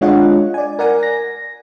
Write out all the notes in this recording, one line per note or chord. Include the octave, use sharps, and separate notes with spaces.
G#3 D4 F4 C#5 D#5 F#5
D5 G#5
A#4 D5 F#5 G#5
A#6